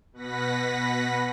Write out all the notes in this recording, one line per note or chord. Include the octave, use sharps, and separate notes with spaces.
B2 B4 F#5 A#6 B6